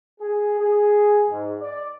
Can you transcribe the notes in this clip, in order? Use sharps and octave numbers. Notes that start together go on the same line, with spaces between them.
G#4
G#4
G#2
D5